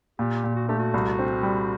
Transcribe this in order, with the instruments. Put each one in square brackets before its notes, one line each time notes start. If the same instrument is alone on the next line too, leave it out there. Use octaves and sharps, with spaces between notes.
[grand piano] A#2 [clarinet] G4
[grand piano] A#2
[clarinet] F#4
[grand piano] A3 [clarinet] G4
[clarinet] F#4
[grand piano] C2
C4
G3